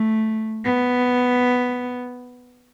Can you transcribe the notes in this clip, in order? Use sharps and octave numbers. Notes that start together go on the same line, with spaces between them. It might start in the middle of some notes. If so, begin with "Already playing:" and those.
Already playing: A3
B3